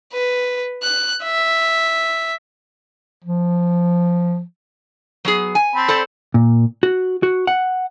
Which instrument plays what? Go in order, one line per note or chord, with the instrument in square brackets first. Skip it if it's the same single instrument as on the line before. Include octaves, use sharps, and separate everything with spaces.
[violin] B4
F#6
E5
[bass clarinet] F3
[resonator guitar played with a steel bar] F#3 B3 G#4
G#5
[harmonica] C4 A5 B5
[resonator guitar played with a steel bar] A4 C5 D5
[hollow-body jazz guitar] A#2
F#4
F#4
F#5